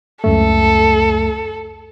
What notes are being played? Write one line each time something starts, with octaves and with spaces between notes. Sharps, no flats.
C#2 F#2 A3 A4